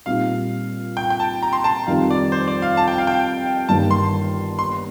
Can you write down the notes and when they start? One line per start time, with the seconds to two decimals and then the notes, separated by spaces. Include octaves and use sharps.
0.06 A#2 G3 C4 D#4 F5
0.97 G5
1.10 G5
1.20 A5
1.42 A#5
1.53 C6
1.64 A5
1.87 F2 D#3 G3 F5
2.10 D5
2.32 C5
2.48 D5
2.62 F5
2.77 A5
2.88 G5
2.98 F5
3.07 G5
3.69 G1 G2 D#3 A#3 A5
3.91 C6
4.59 C6